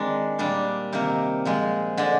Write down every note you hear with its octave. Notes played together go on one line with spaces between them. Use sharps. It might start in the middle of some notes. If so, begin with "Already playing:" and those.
Already playing: D#3 G#3 C4 D4
A#2 G3 D4
C3 D#3 A#3
A#2 F3 G#3
D3 G#3 D4